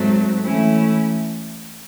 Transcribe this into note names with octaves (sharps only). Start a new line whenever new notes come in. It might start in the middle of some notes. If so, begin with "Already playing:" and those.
Already playing: G#2 F#3 A3 C4
E3 A3 C#4 E4